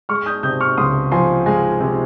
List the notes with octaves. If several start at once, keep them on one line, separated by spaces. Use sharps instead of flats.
G#3 C#6 F6
D#6 G6
C3 D#6 G6
C#6 F6
C#2 C6 D#6
F3 G#5 C6
G#3 F5 G#5
C3